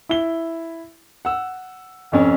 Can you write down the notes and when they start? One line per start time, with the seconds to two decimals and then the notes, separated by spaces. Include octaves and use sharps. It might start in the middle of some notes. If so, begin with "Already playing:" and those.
0.09 E4 G7
1.25 F#5 E6
2.12 F1 F2 C#4